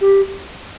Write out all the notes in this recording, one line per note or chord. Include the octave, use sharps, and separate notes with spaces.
G4